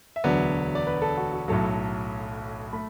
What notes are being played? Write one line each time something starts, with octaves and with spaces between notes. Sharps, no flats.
E5
E1 D2 D3 F#3 B3 D5
D5
B4
A4
F#4
F#4
B1 A2 F#3 A4
A3 B5